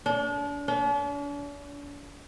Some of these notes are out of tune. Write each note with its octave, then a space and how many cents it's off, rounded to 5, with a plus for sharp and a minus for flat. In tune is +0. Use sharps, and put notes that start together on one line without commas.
D4 -35
D4 -45